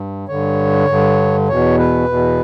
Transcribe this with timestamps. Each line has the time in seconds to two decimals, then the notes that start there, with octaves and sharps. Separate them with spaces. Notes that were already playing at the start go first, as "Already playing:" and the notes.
Already playing: G2
0.28 G2 D3 C#5
0.88 G2 D3
1.48 E2 B2 C#5
1.79 B4
2.09 E2 B2